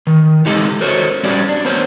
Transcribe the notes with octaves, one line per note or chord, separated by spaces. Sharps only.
D#3
C#3 G#3 D#4 G4 A4 D#5
F#4 A4 A#4 C5 C#5
G3 C#4 F#4 G4 D5
D4
B3 A#4 C5 C#5